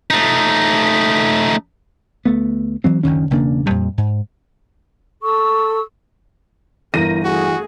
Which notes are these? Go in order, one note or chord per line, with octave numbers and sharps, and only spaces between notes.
A3 D#4
D2 A3 B3
E3 F#3 C4
F#1 D2 D#3 C#4
E1 C#3 A#3 D4
F2 A#2 G3
G#2
A4 C#6 E6
G1 E3 E4 A#4 A#6 D#7
A3 F#4 G#4